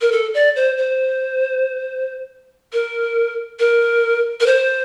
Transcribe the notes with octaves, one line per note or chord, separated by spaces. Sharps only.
A#4
A4
D5
C5
C5
A#4
A#4
A#4
C5